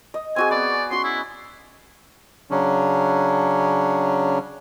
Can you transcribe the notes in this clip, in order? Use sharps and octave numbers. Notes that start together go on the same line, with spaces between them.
D#5
C4 F#4 G#4 G#5
B3 D5
C#4 F#4 C6
E4
C#3 F#3 C#4 D4